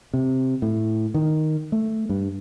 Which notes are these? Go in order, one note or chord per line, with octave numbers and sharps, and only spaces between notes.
C3
A2
D#3
A3
G2